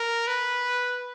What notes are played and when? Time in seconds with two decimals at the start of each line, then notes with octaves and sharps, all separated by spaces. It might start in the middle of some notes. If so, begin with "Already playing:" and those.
Already playing: A#4
0.27 B4